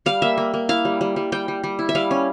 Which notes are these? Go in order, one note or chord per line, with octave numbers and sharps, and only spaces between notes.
G3 F5
A#3 E5
A#3
A#3
E4 F5
G3
G3
G3
G3 G5
G3
G3
E4
E5
G3 F5
C#4